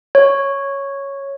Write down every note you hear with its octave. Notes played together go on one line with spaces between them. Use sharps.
C#5